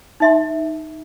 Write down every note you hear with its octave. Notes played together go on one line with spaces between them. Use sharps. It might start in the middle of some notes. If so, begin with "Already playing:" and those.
D#4 E5 C6